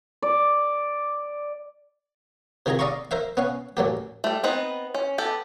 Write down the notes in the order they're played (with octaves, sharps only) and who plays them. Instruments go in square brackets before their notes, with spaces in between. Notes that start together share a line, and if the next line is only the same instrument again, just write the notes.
[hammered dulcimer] D5
[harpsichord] C3 D#3 F4 G#4 A#5
D5 D#5 F5 A#5 C6 C#6
A#4 C5 E5 F5
B3 C#4 F5
A1 F#3 A#3 G4
[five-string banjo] G3 A3
B3 C4 D#4 B4
C#4
B3 G4 A4